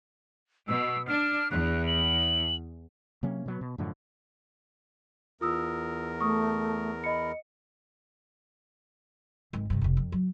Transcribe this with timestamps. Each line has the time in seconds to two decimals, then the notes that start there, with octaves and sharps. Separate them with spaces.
0.68 B2 E6
1.08 D4 F6
1.51 E2 F#6
1.87 F#7
3.23 C3 F#3 A#3 C#4
3.46 B2 F#3 B3
3.61 B2
3.78 F#2 A2 D3 F3
5.41 E2 F4 A#4 D#6 E6
6.20 A3 C#6 D#6
7.04 D#5 B5 C#7
9.53 G#1 G#3
9.70 G2 C3
9.82 F1 C3
9.97 F2
10.12 F#3